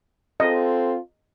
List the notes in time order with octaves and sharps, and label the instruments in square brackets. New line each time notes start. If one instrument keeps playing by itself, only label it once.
[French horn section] C4 F4 A4 [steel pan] D#5